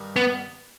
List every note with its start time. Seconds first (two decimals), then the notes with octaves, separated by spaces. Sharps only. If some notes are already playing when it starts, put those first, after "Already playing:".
Already playing: G2 D#3 G3
0.16 B3